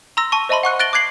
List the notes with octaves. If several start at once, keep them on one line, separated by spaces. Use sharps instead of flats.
A#5 C6 E6 A#6
A5 C#6
C5 D#5 E5 A5 B5 C6
F#5 C#6 F#6 C#7
F#6 A6 A#6 D7 F#7 G7
D6 F#6 G#6 C7 F#7